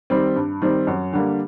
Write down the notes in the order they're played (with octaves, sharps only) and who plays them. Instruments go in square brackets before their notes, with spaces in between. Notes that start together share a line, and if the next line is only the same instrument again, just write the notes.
[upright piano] D#3 G3 C4
G2
D#3 G3 C4
F#2
D3 G3 A#3